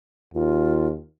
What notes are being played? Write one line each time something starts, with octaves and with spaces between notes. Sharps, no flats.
D#2 F4